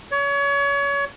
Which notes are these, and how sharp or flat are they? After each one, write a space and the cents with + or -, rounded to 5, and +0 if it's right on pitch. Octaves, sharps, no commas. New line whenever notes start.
C#5 +30